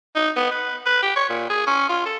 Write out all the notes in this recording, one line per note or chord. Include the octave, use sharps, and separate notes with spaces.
D#4
B3
B4
B4
G4
C#5
A#2
G#4
C#4
F4
A4